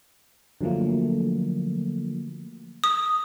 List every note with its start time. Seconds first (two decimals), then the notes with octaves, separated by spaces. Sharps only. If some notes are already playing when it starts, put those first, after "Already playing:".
0.61 D3 F3 F#3 A3 A#3
2.84 D#6